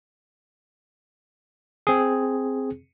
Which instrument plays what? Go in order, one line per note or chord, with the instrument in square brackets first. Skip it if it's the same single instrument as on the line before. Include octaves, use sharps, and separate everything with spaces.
[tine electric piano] C4 G#4